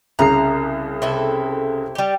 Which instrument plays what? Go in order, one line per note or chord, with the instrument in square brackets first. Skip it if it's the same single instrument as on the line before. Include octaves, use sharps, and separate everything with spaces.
[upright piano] C2 C#3 C7 [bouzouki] A#5
[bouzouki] C3 E4 A4
G3 G4